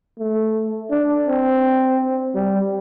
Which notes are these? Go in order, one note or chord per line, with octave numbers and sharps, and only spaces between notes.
A3
D4
C4
G3